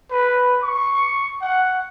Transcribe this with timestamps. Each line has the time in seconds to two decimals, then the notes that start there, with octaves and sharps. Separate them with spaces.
0.11 B4
0.62 C#6
1.41 F#5